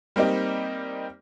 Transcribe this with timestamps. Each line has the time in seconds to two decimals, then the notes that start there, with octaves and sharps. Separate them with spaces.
0.16 G3 A#3 C4 D#4 G4